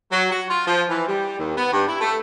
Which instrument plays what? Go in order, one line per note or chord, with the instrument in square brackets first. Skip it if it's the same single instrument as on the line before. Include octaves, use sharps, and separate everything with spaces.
[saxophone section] F#3
F#4
F4
F3
E3
G3
D#2
B3
G2
E4
A3